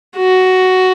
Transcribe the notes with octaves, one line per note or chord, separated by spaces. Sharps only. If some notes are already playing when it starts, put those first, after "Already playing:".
F#4